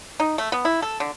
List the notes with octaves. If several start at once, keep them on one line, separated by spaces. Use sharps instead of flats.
D#4
A3
B3
E4
A4
D3